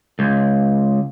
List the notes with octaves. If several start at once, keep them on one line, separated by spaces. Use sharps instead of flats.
C#2